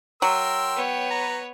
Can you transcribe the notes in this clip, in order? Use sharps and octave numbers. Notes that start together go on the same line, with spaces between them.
F#3 A#4 G5 C6 E6
B3 C#5
B4 A#5